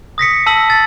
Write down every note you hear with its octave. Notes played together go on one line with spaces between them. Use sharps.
D#6 A#6 B6 C#7
A5 E6 B6 F#7
A6